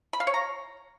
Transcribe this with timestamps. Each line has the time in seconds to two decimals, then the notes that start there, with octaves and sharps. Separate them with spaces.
0.13 B5
0.20 F5
0.27 C#5
0.34 A#5